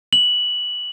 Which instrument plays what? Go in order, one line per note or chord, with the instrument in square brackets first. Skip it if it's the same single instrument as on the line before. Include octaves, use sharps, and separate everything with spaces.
[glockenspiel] F#7